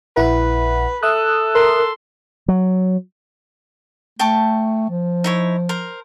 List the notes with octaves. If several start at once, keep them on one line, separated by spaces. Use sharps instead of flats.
A#1 E4 B4 F#5
A4 E5 D#6 F#6
A#4 C6
F#3
A3 G5 A5 C#6
F3
D#4 E4 C#5
A#4 C5